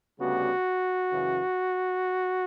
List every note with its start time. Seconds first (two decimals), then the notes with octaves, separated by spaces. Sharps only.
0.19 D2 C#3 G3 B3 F#4
1.09 F#2 C#3 E3